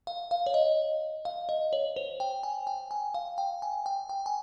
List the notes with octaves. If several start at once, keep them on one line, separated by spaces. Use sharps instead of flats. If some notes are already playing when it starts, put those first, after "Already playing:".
F5
F5
C#5
D#5
F5
D#5
C#5
C5
G5
G#5
G5
G#5
F5
G5
G#5
G5
G5
G#5